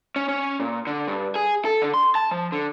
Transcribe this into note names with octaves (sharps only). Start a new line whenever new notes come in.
C#4
C#4
A#2
D3
G2
G#4
A4
D3
C6
A5
F3
D3